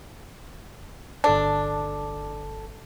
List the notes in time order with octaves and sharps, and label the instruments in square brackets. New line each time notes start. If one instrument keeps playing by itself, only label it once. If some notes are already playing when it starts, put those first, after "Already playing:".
[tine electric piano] G1 A4 A5 [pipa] D4